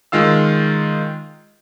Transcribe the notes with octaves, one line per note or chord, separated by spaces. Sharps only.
D#3 G#3 F4 F5 E6